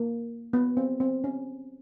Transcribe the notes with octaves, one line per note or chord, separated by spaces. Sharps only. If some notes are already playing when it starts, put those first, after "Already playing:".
Already playing: A#3
B3
C4
C4
C#4